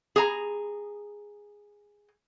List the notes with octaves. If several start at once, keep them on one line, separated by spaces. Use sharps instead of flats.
G#4 A#5